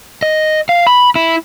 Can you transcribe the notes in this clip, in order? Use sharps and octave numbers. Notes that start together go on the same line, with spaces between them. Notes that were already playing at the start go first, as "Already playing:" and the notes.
D#5
F5
B5
E4